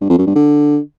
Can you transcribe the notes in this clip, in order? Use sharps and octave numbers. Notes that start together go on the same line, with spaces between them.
G2
F2
F#2
G2
D3